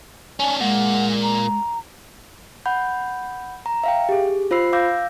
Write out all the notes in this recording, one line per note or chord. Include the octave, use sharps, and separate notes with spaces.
C#4 D4 G#5
A#2 G#3 A#3 F#5
A#5
F#5 B5 G6
A#5
E5 F5 G5
G4 G#4
F4 C5 B5 E6 C7
F5 D6 E6 G6 A#6